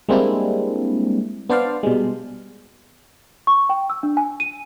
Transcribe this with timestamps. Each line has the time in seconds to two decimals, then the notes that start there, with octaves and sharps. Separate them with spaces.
0.09 G3 G#3 A#3 C4 D4 E4
1.49 B3 D4 C5 D5 F5
1.83 B2 G3 G#3
3.47 C#6
3.69 G5
3.90 E6
4.03 D4
4.17 G#5
4.40 D#7